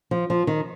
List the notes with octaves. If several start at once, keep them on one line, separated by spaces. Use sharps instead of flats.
F3
F3
D#3